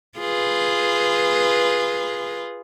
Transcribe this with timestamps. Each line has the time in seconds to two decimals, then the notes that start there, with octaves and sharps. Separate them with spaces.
0.18 F4 G#4 B4